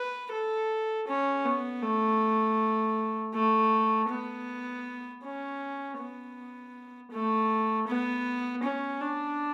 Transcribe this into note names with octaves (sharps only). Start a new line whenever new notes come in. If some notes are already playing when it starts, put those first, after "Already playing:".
Already playing: B4
A4
C#4
B3
A3
A3
B3
C#4
B3
A3
B3
C#4
D4